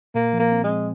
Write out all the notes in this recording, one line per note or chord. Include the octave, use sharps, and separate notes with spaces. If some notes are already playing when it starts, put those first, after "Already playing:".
A#2 A#3
F3
A#3
C4
G#3
C4